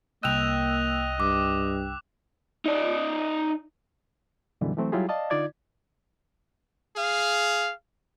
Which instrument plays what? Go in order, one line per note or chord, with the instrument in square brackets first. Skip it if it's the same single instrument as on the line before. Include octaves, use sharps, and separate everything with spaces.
[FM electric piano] C2 G5 E6 [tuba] A#3 [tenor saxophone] D#5 [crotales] F#6 F7
[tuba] G2 [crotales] D6
[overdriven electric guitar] D#4 D5
[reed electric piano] F#2 B2 D3 E3 G3
E3 F#3 A3 C4
F#3 G3 E4 F4 G4 G#4
D5 D#5 F5 A5
D3 D#4 F4 D5 G#6
[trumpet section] G#4 F5